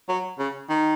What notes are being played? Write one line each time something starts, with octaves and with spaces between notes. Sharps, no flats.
F#3
C#3
D#3